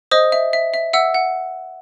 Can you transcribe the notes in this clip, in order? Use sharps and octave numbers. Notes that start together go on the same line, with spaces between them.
C5 D#5 D#6
E5
E5
E5
E5 F#5 E6
F#5